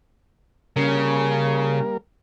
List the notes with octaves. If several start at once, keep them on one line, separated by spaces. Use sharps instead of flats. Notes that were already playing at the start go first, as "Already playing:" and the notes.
C#3 G3 A#3 A#4